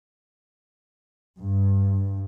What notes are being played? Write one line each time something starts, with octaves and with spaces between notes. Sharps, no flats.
G2